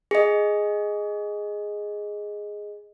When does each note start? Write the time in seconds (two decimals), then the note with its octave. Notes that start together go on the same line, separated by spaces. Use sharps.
0.11 G#4 D#5